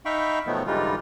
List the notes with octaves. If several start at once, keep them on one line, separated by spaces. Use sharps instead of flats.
D#4 E5 F5 G5 B5 C#6
B2 D#3 F3 F#3 A3 B3
G#2 D3 E3 G3 D#4 F4